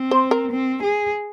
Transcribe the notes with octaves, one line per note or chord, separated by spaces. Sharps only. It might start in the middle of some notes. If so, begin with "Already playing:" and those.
Already playing: C4
C5
A#4
C4
G#4